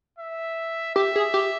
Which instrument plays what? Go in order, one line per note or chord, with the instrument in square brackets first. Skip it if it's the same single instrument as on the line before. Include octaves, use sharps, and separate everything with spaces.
[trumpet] E5
[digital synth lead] G4 [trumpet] E5
[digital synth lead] G#4
G4